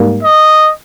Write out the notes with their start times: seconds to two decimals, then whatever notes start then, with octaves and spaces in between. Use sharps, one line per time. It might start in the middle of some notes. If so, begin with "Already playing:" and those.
Already playing: G#2 G3 A#3
0.21 D#5